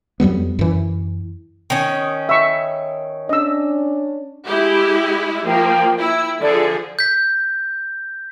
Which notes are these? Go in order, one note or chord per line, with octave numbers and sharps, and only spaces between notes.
F2 F#3 G3 B3
F#2 E3
D#3 C#4
E5 C#6
C#4 D4 D#5 E6
G#3 E4 G4
F3 A#3 A#4 G5
E4 G5 E6
D3 F3 G#4 A4 D5
G6 B6